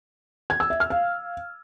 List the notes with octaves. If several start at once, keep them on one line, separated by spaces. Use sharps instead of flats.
G#6
E6
E5
F6
F5